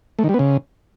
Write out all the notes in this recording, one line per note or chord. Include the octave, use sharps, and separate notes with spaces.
A3
D#3
G3
B3
C#3